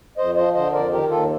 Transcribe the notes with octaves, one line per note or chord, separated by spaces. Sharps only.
F2 C5 D#5
F3 C5 D#5
D3 C5 D#5
F2 A#4 D5
D#3 G4 A#4
D#2 F4 A4